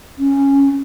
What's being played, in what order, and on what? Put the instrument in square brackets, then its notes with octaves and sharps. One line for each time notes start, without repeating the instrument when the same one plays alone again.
[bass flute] C#4